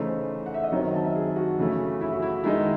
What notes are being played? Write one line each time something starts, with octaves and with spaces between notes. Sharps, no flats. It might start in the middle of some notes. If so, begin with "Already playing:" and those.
Already playing: C#3 E3 A3 D#4 C5
F#5
E5
D#5
D#3 F#3 C4 C#5
D#5
A5
E5
G#4
F#4
C#3 E3 A3
E4
F#4
E4
D#3 G#3 D#4 E4